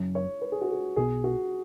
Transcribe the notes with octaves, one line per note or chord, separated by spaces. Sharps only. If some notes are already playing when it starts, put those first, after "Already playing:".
Already playing: F#1 F#2 F#3 C#4
C#5
B4
G#4
F#4
G#4
B1 B2 B3 G#4
F#4